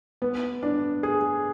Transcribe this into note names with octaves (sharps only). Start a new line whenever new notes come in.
B3
D4
G#4